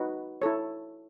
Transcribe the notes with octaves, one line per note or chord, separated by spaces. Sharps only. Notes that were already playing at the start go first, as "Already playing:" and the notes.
Already playing: D#4 F#4 B4
E4 A4 C#5